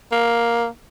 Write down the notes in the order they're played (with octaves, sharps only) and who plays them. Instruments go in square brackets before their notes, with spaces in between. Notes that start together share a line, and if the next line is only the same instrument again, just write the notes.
[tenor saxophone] A#3